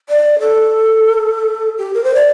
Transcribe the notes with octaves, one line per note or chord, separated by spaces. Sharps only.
D5
A4
G4
A#4
C5
D5